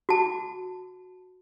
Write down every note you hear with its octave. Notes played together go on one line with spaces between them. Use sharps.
F#4 A5